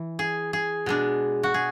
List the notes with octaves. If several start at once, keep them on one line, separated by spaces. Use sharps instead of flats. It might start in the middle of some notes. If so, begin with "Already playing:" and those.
Already playing: E3
G#4
G#4
B2 G#3 D4
F#4
G#4